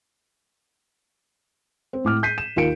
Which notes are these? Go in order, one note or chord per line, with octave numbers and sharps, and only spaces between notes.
C4
A2 D6 F6
G6 B6 C7 D#7
E7
D#2 F4 A#4 F5 C#7 D7